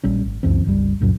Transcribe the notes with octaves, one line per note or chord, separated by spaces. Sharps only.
A#1 G3 C#4
G#1
C#2 F#2 E3 C4
G1 C#2 B2 G3
C#2 F#2 A#2 F#3